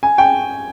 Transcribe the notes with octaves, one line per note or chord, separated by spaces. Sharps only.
G#5
G5